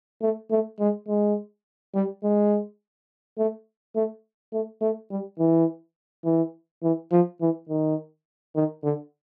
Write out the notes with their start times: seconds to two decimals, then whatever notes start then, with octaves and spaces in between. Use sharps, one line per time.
0.22 A3
0.51 A3
0.80 G#3
1.08 G#3
1.95 G3
2.24 G#3
3.38 A3
3.96 A3
4.53 A3
4.81 A3
5.10 G3
5.39 E3
6.25 E3
6.83 E3
7.12 F3
7.41 E3
7.69 D#3
8.56 D#3
8.84 D3